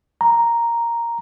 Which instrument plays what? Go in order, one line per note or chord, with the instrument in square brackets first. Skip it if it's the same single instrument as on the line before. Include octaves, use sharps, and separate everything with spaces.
[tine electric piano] A#5